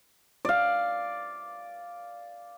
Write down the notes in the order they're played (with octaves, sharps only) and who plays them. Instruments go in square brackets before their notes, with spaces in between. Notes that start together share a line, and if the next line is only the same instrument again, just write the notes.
[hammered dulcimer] D5 F5